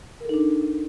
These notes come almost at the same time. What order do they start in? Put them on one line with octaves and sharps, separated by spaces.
A#4 A4 D#4 D4